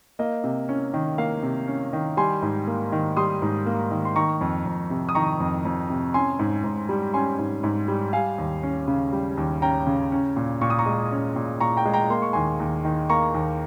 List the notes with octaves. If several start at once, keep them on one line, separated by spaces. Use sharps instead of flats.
A#3 D#5
C3
C#4
D#3
A#3 F5
C3
C#4
D#3
G3 G#5 C6
G#2
A#3
D#3
G3 C6 D#6
G#2
A#3
D#3
C6
D#3 A#5 C#6
F2
F2
C3
D#6
D#3 A#5 C#6
F2
F2
C3
C#4 G#5 C6
G#2
G#2
G3
C#4 G#5 C6
G#2
G#2
G3
G3 F5 G#5
D#2
C#4
C#3
G3
D#2
C#4 G5 A#5
C#3
C#4
A#2
A#2 C#6
D#6
A#5 C#6
G#3
C#4
A#2
A#2 A#5 C#6
G5 A#5
G#3
G5 A#5
A#3 C6
C#6
D#2 G#5 C6
D#2
D#3
A#3 A#5 C#6
D#2